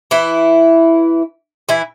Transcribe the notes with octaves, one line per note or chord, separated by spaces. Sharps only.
E3 E4
E3 E4